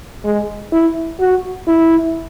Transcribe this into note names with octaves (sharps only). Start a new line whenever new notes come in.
G#3
E4
F#4
E4